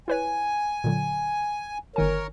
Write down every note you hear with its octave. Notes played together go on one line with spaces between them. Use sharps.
E4 B4 C#5 G#5
A#2 D3 F#3
G1 D#3 A#4 C#5 G#5